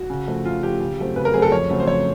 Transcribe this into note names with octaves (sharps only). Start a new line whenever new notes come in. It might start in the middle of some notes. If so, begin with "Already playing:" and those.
Already playing: F#4
C#3
F3 A3
C#3 F4
F3 A3 G4
C#3
F#3 A3 C4
C#3 B4
A#4
F#3 A3 C4 G#4
A4
F2 C#5
C#3 F#3 A3 C4
C5
F2 C#5